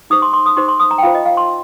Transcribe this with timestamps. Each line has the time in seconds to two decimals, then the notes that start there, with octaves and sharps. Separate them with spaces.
0.10 D#4 G4 C5 D#6
0.22 C6
0.33 C6
0.46 D#6
0.57 D#4 G4 C5 C6
0.68 C6
0.80 D#6
0.91 A#5
0.98 G5
1.03 F4 C5 F5
1.15 D#5
1.25 F5
1.37 C6